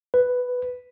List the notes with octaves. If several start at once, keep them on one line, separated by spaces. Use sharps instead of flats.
B4